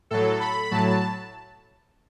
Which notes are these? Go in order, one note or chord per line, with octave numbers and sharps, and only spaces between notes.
A2 F#3 A4
B5
A2 F#3 A5